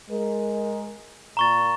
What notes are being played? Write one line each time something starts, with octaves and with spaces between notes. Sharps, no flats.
G#3 A#4
A#2 A#5 C#6 A6